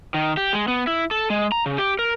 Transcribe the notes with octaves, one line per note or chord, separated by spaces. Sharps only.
D#3
G4
G#3
B3
E4
A4
G#3
A#5
C#3
G4
A#4